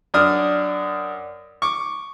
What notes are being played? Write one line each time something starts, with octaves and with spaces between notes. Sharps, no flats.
F#2 D4 D#6 F6
C#6 D6